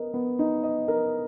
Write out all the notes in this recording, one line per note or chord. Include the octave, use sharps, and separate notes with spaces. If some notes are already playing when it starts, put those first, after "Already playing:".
Already playing: B3 A#4 D#5
B3
D#4
D#5
A#4